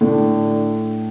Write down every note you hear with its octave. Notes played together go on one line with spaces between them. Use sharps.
A2 D3